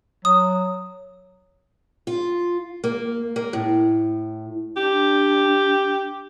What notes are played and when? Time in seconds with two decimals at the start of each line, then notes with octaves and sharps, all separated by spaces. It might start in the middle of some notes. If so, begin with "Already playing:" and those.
0.25 F#3 D#6
2.07 F4
2.84 A#3
3.36 A#3
3.53 A2
4.77 D4 G4